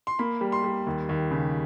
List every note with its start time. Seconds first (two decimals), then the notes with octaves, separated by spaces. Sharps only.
0.07 C6
0.19 A#3 B5
0.41 G3
0.52 C6
0.64 G3
0.87 D#2
1.09 D#2
1.31 C#3